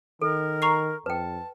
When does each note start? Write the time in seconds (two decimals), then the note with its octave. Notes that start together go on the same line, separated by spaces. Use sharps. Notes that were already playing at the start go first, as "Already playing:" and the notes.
0.22 D#3 A4 A#4
0.62 A#5 C#6 C7
1.06 F2 B4 G5 A5